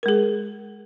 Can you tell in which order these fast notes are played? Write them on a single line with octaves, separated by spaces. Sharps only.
A#4 G#3 G#4